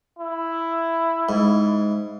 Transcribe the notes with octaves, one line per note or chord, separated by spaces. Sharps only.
E4
G#2